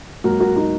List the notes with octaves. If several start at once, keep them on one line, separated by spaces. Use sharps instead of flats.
G#2 F#3 A#3 F#4 A#4
F#4 A#4
D#4 F#4